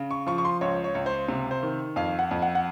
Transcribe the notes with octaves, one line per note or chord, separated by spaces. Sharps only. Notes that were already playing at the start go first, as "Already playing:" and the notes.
Already playing: C#3
C#6
F3 C#6
C#6
C6
C#2 C#5
C#5
C#2
C5
C3
C5
D#3
F2 F5
F#5
F2
F#5
F#5